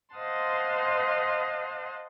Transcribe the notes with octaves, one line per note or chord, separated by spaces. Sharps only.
C5 D#5 F5 F#5 A5 C6